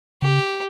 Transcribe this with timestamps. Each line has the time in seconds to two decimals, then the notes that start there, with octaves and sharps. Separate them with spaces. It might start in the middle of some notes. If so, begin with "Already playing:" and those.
0.22 C#3 G4